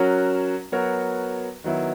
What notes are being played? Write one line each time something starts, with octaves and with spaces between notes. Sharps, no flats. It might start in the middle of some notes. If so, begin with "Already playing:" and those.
Already playing: F#3 C#4 F#4 A#4 C#5
F#3 B3 F#4 A#4 C#5
D#3 F#3 B3 E4